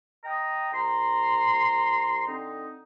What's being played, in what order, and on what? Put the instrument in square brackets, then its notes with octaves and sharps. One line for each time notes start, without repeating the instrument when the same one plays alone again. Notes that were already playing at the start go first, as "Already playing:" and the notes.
[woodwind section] D#5 G5 A#5 D#6
C2 A#5 C6
D3 C4 D#4